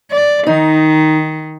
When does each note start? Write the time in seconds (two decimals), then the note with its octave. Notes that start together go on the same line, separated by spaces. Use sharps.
0.11 D5
0.46 D#3 D#4